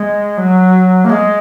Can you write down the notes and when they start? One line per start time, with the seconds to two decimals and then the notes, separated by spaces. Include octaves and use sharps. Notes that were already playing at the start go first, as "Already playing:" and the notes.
Already playing: G#3
0.38 F#3
1.05 A#3
1.10 G#3